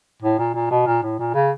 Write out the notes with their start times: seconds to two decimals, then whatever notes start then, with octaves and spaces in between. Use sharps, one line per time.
0.23 A2
0.39 A#2
0.55 A#2
0.71 B2
0.87 A#2
1.03 A2
1.19 A#2
1.34 C#3